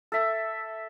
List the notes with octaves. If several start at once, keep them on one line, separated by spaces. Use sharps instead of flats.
A4 E5